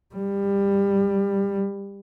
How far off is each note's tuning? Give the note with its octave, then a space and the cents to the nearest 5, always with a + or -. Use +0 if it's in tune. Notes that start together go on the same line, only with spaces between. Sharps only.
G3 +20